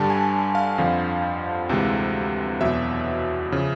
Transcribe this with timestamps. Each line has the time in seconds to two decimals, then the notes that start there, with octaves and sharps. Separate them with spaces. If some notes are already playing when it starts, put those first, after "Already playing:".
Already playing: G2 D3 G3 A5
0.10 G#5
0.55 F5
0.78 F2 D3 F3
1.69 D2 C3 E3 G#3
2.60 E2 B2 F#3 E5
3.52 C#3 F3